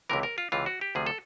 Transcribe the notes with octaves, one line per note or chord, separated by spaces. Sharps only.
C#2 C3 E3 A#4
A#4
F4
C#2 C3 E3 F4
F#4
G4
D2 C3 F3 G#4
A4